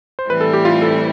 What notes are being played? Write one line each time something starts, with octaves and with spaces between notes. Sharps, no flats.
C5
A2 E3 G3 C4 E4 B4
A4
G4
F4
A4